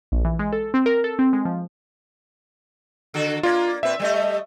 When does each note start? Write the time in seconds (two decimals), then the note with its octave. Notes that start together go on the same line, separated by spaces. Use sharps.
0.12 A#1
0.25 E3
0.39 G#3
0.53 A4
0.74 C4
0.86 A#4
1.04 A4
1.19 C4
1.33 G#3
1.45 F3
3.14 D3 F#4 A4
3.43 A#3 F4 D5
3.83 A#2 C4 B4 E5
4.00 G3 A3 D#5